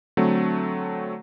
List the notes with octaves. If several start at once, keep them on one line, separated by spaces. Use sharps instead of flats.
D3 F#3 A3 C4